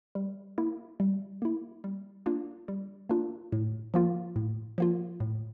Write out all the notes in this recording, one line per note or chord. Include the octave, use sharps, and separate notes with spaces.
G3
A#3 E4
G3
A#3 E4
G3
A#3 D4 F4
G3
A#3 D4 F4
A2
F3 A#3 F4
A2
F3 A#3 F4
A2